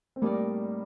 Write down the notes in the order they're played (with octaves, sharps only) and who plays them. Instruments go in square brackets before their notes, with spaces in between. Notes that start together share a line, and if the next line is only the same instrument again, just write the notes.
[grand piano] C4
[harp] A2 A3 D#4 A#4 D5 [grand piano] G3 A#3